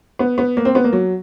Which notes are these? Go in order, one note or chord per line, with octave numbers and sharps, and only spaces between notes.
B3
B3
A#3
C4
B3
A#3
F#3